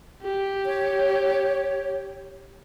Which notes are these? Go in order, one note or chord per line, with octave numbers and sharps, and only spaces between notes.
G4
C#5